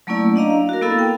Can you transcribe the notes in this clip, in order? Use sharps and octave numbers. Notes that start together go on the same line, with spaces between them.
F#3 A3 A#3 C#4 E4 D5
D4 D#5 F5 A#5
F5
F#4 A#4
A#3 B3 E4 A4 F5
G5